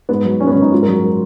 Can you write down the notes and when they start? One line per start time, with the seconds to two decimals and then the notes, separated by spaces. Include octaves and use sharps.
0.09 G#2 B3
0.25 F#3
0.40 G#2 C#4
0.47 B3
0.51 C#4
0.56 D#3
0.62 D#4
0.72 G#2 F4
0.83 A#4
0.88 F#3
1.04 A#4